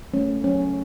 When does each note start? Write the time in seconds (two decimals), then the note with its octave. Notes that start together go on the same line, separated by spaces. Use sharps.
0.14 A3 C#4
0.44 F#3 C#4